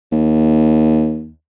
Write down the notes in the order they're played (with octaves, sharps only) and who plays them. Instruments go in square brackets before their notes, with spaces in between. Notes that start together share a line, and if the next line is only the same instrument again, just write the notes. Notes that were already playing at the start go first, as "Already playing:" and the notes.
[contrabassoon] D#2